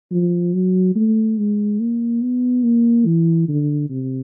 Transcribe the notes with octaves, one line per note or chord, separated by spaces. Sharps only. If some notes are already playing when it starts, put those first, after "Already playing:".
F3
F#3
A3
G#3
A#3
B3
A#3
E3
D3
C3